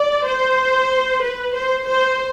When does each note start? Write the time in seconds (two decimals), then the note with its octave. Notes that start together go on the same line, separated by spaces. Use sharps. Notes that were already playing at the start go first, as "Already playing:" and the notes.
Already playing: D5
0.26 C5
1.23 B4
1.55 C5
1.88 C5